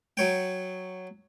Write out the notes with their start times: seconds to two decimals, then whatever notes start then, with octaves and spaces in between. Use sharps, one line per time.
0.17 F#3 C#5 G5